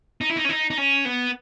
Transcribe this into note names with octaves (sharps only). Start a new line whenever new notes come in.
D#4
E4
D#4
C#4
D#4
D#4
C#4
B3